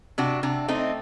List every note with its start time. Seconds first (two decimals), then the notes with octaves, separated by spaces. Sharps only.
0.18 C3 D4 F#4
0.43 C3 D4
0.68 A3 C4 D#4